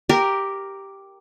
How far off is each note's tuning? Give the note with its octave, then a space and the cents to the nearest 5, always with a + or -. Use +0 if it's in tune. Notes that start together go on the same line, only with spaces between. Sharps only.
G4 +0 A#4 +0